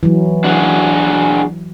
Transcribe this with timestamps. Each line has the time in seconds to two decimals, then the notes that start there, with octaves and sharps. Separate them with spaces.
0.03 E3 F#3
0.44 D4 F#4 G#4